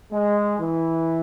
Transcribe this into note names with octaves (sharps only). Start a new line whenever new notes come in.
G#3
E3